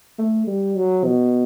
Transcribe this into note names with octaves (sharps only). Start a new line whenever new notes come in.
A3
G3
F#3
B2